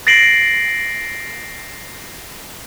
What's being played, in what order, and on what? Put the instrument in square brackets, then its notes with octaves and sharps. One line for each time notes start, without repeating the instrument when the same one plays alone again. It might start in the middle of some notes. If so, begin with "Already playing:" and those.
[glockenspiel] A6 A#6 C7 D7 F#7